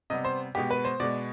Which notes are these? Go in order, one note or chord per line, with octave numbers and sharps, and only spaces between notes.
C3 G3 B3 D#5
C5
B2 G#3 B3 G4
B4
C5
B2 G#3 B3 D5